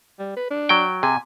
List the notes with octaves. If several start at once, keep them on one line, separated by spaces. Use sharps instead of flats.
G3
B4
D4
F#3 G5
C3 G#5